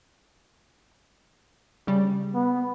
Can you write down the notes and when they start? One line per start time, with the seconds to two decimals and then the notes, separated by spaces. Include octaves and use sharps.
1.87 C#3 G3
2.34 B3